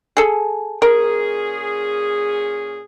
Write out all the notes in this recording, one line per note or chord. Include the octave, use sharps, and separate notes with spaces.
G#4 A4
A#2 C#4 G#4 A#4